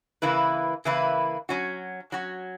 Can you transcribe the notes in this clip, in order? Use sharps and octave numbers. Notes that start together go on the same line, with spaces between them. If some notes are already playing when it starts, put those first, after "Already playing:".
C#3 E3 A#3 E4 B4
C#3 E3 A#3 E4 B4
F#3 C#4 F#4
F#3 C#4 F#4